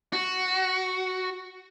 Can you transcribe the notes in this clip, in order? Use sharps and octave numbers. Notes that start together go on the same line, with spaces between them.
F#4